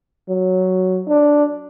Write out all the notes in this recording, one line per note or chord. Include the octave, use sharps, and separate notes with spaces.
F#3
D4